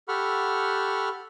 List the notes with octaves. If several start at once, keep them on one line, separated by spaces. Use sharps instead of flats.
G4 A4 F#5 B5 C#6 F6